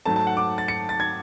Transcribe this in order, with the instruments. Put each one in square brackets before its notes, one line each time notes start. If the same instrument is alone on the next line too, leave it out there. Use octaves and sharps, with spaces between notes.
[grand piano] G#2 F#3 A3 A5
A5
F#5
D6
A6
C#7
A6
G#6